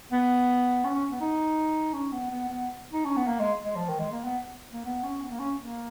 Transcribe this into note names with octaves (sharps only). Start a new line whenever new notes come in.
B3
C#4
C#4
B3
D#4
C#4
B3
B3
B3
D#4
C#4
B3
A#3
G#3
G#3
F3
D#3
G#3
A#3
B3
A#3
B3
C#4
B3
A#3
C#4
A#3